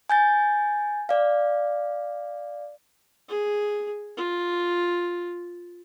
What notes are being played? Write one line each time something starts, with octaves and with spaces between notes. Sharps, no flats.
G#5 G6 A6
D5 F5
G#4
F4